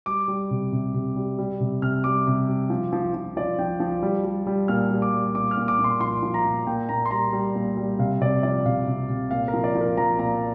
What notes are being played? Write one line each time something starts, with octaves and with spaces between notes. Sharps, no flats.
G3 D6
G3
C3
C3
C3
G3
G3
C3
C3 F6
G3 D6
C3
G3
F3
F3
F3
F3 D5
F3 G5
F3
G3
G3
G3
A#2 F6
G3
D6
G3
A#2 D6
F6
A#2
D6
A#2
C6
F3 C6
F3
A#5
A#2
A#2 G5
A#2 A#5
C6
G3 A#5
G3
A#2
G3
C3 F5
C3 D5
F3 D5
C3 F5
C3
C3
A#2 F5
A#4
F3
D5
F3
A#4
F3 A#5
A#2 A#5